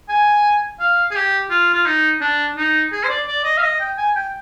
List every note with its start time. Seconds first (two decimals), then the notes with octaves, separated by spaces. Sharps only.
0.09 G#5
0.80 F5
1.11 G#4
1.15 G4
1.50 F4
1.74 F4
1.86 D#4
2.21 D4
2.56 D#4
2.92 G#4
3.04 C5
3.09 D5
3.28 D5
3.44 D#5
3.58 F5
3.63 D#5
3.80 G5
3.98 G#5
4.15 G5